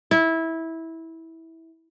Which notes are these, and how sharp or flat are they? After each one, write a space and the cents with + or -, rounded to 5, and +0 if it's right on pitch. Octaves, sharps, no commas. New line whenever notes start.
E4 -15